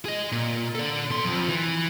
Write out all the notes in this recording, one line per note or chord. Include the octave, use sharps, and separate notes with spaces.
G#4 D#5
A#2
A4 D5
B2 C6
F2 F3
E3